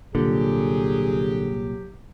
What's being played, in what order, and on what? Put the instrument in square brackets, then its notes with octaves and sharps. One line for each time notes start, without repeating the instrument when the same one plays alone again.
[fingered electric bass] C2 A#2 [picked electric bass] D3 [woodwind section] F#3 G4 [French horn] G#4